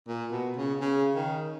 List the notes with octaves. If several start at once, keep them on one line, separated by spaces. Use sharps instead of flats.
A#2
B2
C#3
C#3
D#3